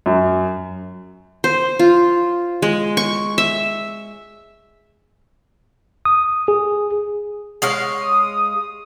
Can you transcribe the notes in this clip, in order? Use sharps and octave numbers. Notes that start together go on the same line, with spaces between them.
F#2
C5
F4
G#3
C#6
E5
D#6
G#4
G#3 C#5 F5
D#6